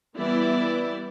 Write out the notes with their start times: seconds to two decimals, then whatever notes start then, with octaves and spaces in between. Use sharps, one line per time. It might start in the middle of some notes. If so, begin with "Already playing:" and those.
0.16 E3 G3 B3 E4 D5